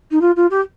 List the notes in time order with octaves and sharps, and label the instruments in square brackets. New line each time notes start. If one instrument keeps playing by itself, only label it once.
[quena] D#4
F4
F4
G4